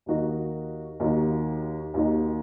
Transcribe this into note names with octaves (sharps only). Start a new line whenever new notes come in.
D#2 D#3 A#3 F#4 D#5
D#2 D#3 A#3 F#4 D#5
D#2 D#3 A#3 F#4 D#5